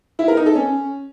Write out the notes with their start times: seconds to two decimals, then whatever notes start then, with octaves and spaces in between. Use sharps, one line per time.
0.19 E4
0.28 A#4
0.37 D#4
0.46 A4
0.55 C#4